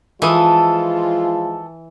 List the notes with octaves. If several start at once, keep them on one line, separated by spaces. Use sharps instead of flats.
E3 F3 G#3 F4 A4 D#6